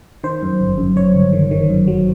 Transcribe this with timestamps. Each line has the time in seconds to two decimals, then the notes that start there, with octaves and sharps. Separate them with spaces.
0.23 D#3 C5
0.42 F#2
0.61 G1
0.78 F#2
0.96 F#2 C#5
1.14 G1
1.33 D#3
1.51 D#3
1.70 F#2
1.87 F#3